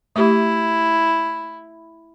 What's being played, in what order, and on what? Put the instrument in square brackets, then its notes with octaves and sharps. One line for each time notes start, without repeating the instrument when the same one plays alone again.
[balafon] A3 G4 [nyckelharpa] E4